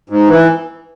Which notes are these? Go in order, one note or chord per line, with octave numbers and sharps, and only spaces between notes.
G#2
E3